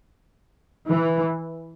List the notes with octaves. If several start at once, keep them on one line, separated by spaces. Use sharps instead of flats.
E3